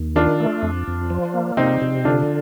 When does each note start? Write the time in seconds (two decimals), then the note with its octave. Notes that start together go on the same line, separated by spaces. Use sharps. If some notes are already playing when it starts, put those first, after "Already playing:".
Already playing: D#2
0.16 D#3 D4 F4
0.40 A3
0.63 F2
0.87 F2
1.10 F3
1.34 A#3
1.57 C3 C4 D#4
1.82 C3
2.05 D3 D4 F4